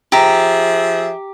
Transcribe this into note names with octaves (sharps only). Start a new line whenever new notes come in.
F3 G4 G#4 E5 A#5